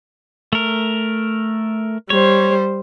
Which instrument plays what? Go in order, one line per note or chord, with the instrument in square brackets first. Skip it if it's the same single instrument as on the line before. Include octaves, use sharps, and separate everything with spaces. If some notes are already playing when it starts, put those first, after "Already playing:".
[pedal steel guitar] A3 A#4
[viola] G3 C5 [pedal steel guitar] C#5